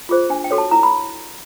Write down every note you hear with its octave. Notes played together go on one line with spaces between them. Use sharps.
F4 G#4 C5
D4 G#5
G5
F#4 A4 C#5
A5
E4 A#5
B5